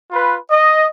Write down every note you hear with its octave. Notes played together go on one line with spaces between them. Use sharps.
F4 B4
D#5